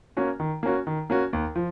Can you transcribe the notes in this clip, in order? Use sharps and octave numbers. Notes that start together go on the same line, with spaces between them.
A#3 C#4 F#4
D#3
A#3 C#4 F#4
D#3
A#3 C#4 F#4
D#2
F3